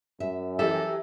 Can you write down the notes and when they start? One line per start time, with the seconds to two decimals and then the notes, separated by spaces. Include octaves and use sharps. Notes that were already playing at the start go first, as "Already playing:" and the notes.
0.20 F#2 E5
0.59 E3 F#3 G4 A4 E5